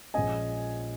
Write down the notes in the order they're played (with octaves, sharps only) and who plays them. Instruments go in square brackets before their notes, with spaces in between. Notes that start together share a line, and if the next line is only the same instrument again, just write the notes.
[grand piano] A#1 A#2 F3 G#3 C#4 D#5 G#5